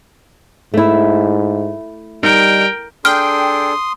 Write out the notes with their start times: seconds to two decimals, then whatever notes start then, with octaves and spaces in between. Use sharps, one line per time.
0.74 G#2 A3 E4
2.23 G3 D#4 A#4 G5
3.05 D4 G#4 A4 G5 C6 D#6 F6